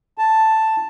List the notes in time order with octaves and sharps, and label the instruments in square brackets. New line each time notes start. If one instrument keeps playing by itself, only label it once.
[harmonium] A5